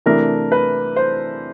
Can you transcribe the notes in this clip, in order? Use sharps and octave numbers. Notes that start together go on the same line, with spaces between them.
C3 E3 A3 D4 A#4
B4
C5